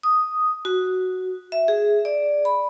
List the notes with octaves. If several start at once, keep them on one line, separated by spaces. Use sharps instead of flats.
D#6
F#4
E5
G#4
D5
B5